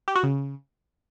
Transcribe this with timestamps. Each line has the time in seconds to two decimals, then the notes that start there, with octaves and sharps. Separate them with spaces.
0.08 G4
0.15 F#4
0.23 C#3